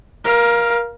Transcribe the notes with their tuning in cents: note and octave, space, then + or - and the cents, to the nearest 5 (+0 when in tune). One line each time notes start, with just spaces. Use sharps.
A#4 +25 F5 +0